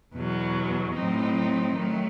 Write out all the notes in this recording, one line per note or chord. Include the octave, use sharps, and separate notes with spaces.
E2 B2 F#3
A2 F#3 C4 D#4
D#3 F#3 A3